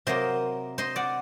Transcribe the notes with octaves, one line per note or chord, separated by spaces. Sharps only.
C3 F#3 A#3 C5 D#5
C5 D#5
D5 F#5